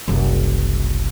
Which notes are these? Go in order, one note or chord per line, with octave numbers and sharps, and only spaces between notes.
F#1 C2